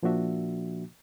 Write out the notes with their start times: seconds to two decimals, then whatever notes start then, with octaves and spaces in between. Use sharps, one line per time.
0.03 A#2 F3 A#3 D4 F#4 E5